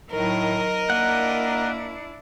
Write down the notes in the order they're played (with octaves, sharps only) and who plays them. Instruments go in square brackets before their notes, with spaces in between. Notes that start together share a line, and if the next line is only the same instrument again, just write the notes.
[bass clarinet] A2 [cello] D#3 F#3 [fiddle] A#4 D#5
[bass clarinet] A#3 [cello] D4 E4 [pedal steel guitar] F#5